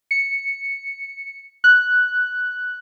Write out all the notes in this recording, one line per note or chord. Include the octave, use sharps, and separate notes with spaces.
C#7
F#6